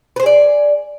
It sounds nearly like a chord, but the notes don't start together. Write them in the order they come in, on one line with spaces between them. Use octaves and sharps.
B4 C5 G#4 D5